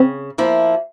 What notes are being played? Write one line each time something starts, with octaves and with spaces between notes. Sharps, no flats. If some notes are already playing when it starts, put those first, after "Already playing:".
Already playing: C#3 C4
F3 A#3 E4